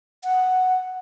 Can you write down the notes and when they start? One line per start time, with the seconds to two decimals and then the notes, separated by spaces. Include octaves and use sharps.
0.24 F#5